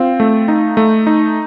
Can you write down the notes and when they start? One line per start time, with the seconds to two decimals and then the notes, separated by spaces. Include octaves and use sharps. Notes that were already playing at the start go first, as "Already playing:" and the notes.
Already playing: C4 F4
0.20 A3
0.48 D#4
0.77 A3
1.07 D#4